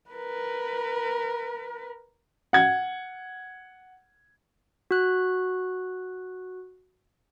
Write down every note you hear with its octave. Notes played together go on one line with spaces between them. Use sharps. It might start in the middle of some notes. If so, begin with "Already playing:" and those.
A#4 B4
F#5 G#6
F#4 F#6